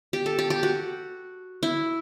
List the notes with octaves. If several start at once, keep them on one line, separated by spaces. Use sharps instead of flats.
G4
A4
G4
G4
F#4
E4